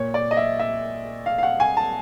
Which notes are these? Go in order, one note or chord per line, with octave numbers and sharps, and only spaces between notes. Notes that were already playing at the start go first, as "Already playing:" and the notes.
Already playing: A#2 C#5
D5
D#5
E5
E5
F5
F5
F#5
G#5
A5